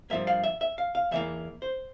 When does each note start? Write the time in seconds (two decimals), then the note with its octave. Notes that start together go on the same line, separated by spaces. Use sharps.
0.10 G2 F3 A#3 E5
0.27 F5
0.44 E5
0.61 E5
0.78 F5
0.95 F5
1.11 E2 E3 A#3 E5
1.62 C5